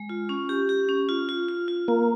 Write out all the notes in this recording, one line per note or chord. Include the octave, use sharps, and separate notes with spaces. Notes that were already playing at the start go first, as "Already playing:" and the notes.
Already playing: G#3
F4
C#4
G4
G4
C#4
F4
F4
F4
F4
A#3 F4